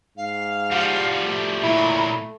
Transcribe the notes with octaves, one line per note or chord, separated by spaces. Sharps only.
G#2 F5
F3 G3 F#5
A3
A#2 F#3 E4 B5